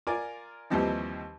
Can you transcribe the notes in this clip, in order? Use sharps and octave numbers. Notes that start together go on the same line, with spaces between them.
F4 A#4 D5 G#5
D#2 E3 F3 G3 C4 D#4